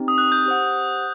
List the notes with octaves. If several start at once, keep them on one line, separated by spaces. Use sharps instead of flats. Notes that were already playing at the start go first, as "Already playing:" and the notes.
Already playing: C4 D#4 G4
D#6
F#6
G6
G4 C5 F#5